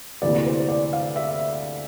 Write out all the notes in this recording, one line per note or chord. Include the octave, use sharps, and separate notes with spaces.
D2 C3 E3 A#3 D5
C5
D5
F5
E5